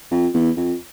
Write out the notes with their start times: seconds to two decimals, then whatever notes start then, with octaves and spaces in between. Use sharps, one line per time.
0.11 F2
0.34 E2
0.57 F2